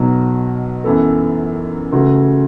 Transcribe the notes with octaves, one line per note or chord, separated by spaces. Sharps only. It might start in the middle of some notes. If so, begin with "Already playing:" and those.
Already playing: B1 B2 F#3
F#2 E3 B3 A4
C#2 C#3 A3 F#4